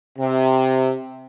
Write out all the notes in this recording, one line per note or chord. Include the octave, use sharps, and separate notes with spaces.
C3